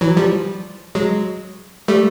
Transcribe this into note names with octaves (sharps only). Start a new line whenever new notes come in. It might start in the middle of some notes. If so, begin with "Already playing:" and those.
E3 F#3
F3 G3
F#3 G#3
G3 A3